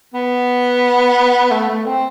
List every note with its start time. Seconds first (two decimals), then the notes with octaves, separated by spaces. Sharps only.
0.14 B3
1.51 A3
1.69 A3
1.86 C4